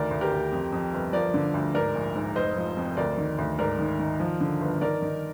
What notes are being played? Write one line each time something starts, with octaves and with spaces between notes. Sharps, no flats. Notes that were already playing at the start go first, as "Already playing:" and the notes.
Already playing: D2 D#3 A#4 D5
D2
G4 A#4
D2
F2
F2
G1
F3 A#4 D5
D3
D2
G#2 A#4 D5
A#1
G#2
F1 C5 D#5
F3
F2
D2 A#4 D5
D#3
D2
G#2 A#4 D5
D#3
D#3
F3
D3
G1
D#3 A#4 D5
D#3